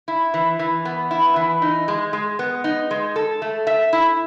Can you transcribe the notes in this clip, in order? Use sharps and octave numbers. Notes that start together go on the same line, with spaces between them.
E4
E3
E3
B3
E4
E3
D#4
G#3
G#3
B3
D#4
G#3
A4
A3
E5
E4